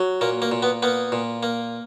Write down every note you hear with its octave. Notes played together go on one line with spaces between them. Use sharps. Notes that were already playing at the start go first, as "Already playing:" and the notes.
Already playing: F#3
A#2 A#3
A#3
A#2
B3
A#3 B3
A#2
A#3